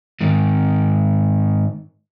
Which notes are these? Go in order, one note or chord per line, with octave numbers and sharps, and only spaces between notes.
G#2 D#3